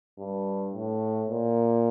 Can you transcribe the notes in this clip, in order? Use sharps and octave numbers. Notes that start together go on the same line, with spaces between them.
G2
A2
A#2